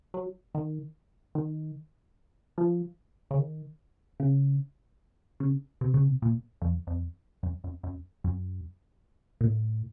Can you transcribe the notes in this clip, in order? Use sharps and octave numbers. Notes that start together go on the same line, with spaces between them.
F#3
D#3
D#3
F3
C#3
D#3
C#3
C#3
C3
C#3
C3
A#2
F2
F2
F#2
F#2
F#2
F#2
A#2
A2